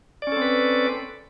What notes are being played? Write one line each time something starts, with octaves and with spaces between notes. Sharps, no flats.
C4 C#4 A4 B4 D5